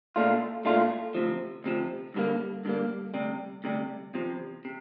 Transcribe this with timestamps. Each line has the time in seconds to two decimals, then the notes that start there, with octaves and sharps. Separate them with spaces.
0.16 A#2 A3 D4 F4
0.65 A#2 A3 D4 F4
1.15 D2 C3 F3
1.64 D2 C3 F3
2.14 G2 D3 G3 A#3
2.65 G2 D3 G3 A#3
3.14 D2 C3 G3
3.64 D2 C3 G3
4.14 E2 C3 F3
4.65 C3